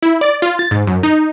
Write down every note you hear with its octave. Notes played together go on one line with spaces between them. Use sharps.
E4
D5
F4
A6
G#2
F#2
D#4